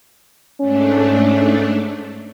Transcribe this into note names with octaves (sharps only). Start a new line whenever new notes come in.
G#2 A3 C#4 D4